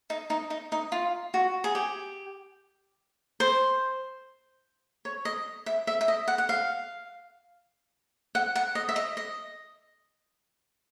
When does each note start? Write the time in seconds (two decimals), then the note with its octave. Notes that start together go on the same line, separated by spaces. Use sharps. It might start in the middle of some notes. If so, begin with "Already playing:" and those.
0.10 D#4
0.30 D#4
0.50 D#4
0.72 D#4
0.92 F4
1.34 F#4
1.64 G#4
1.75 G4
3.40 C5
5.05 C#5
5.25 D#5
5.66 E5
5.87 E5
6.01 E5
6.08 D#5
6.28 F#5
6.38 F#5
6.49 F5
8.35 F#5
8.55 F#5
8.75 D#5
8.89 E5
8.96 D#5
9.17 D#5